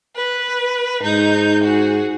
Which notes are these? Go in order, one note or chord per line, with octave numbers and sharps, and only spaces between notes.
B4
G#2 D#4 G6
F#4 G#4